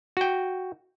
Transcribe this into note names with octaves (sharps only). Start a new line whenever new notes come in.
F#4 G5